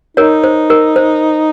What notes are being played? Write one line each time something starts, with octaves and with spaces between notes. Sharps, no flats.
D#4 A#4 C#5
C5
A#4
C5